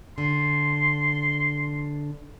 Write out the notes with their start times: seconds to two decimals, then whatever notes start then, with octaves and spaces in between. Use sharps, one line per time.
0.18 D3 C6